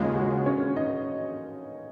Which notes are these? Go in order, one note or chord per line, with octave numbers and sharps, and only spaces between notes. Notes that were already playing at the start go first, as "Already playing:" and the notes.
Already playing: D#2 C#3 G#3 F4
F#4
C#4 C#5
D#4 D#5